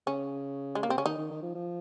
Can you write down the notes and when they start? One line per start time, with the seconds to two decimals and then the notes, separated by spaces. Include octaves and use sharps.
0.07 C#3 C#4
0.75 G#3
0.83 A#3
0.88 C3 C4
0.97 C#3 C#4
1.06 D#3 D#4
1.18 D#3
1.31 D#3
1.43 F3
1.55 F3